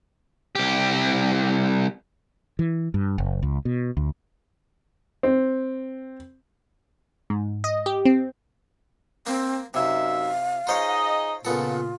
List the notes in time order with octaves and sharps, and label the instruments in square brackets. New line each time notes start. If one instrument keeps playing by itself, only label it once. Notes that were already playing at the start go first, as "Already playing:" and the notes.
[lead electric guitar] C2 G4
[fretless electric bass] E3
G2
F#1
C#2
B2
D2
[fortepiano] C4
[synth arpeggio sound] G#2
D#5
G4
C4
[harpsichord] A#3 [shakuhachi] C4
[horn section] F#2 D#4 E5 [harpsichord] C3 [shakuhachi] F5
[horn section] D#4 G#4 D#5 [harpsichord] F4 C5 C#5
[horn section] A#2 [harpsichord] C#3 B3 A4 [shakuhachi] F4